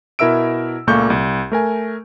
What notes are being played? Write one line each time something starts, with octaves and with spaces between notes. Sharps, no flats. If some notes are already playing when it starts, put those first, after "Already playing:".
B2 E4 A#4 E5 E6 D7
C#2 A#2 A3 A#3 C#6 G6
C2
A3 A#4 G#5